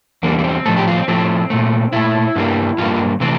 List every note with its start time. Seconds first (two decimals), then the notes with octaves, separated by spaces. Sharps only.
0.23 E2 D3 G3 A#3
0.39 A#3
0.44 C4
0.65 A2 F3 A3 A4
0.77 G4
0.87 F4
0.97 C4
1.08 A2 F3 A3 C4
1.50 A#2 A3
1.93 A#2 A3 E4
2.36 G2 D3 G3 A#3
2.78 G2 D3 G3 A#3 F4
3.20 C3 E3 A3 C4